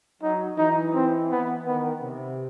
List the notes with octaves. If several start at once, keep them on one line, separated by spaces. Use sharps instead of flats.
F#3 D#4
E3 D#4
C4
B3
D#3 B3
C3